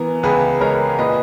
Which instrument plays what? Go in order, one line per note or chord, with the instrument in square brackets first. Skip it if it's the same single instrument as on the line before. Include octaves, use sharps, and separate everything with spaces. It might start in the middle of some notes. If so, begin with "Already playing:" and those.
Already playing: [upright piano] E3 B3 [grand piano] A#4
[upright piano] C#2 [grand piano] G#4 B4
[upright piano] G#3 [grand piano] A#4 C#5
[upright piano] A#2 [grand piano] B4 D#5